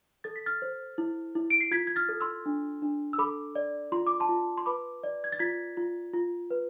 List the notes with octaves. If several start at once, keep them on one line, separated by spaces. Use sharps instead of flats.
A4 A6
B6
F6 A6
C5
E4
E4
D7
C7
F4 G#6 B6
G#6
F6 A6
A4
C6 E6
D4
D4
E6
A4 B5 D6
D5
F4 C6
D6
A5 C6
F4
C6
B4 B5 D6
D5
G#6
A6
F4 G#6 B6
F4
F4
B4